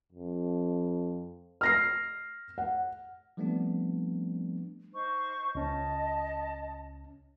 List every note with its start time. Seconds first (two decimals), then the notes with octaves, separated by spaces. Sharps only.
0.13 F2
1.61 F6 A#6 C7
2.58 F#5
3.37 F3 G3 A3 B3 C4 D4
4.93 D#4 C5 C#6
5.55 C#2 C#4 D#5 A5